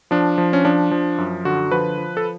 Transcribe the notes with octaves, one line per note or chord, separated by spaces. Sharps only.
F3 D4
F3
C#4
F3 D4
F3
F#2
D3 F#4
F3 B4
F3
A4